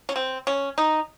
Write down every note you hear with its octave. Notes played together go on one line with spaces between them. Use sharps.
C#4
C4
C#4
D#4